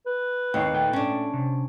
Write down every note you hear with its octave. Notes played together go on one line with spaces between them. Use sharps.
B4
D#2 C4 C#5 G5
A#2 A3 G5
C#4 D4
C3